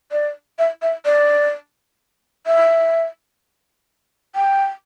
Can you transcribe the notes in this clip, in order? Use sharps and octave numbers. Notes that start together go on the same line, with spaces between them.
D5
E5
E5
D5
E5
G5